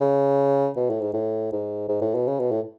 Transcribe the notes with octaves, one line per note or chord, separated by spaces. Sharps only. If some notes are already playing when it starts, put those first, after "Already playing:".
C#3
B2
A2
G#2
A2
G#2
G#2
A2
B2
C#3
B2
A2